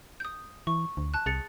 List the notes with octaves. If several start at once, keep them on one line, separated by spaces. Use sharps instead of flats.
D#6 G6
E3 C#6
D2
A5 F#6
C2 G#4 A6 C#7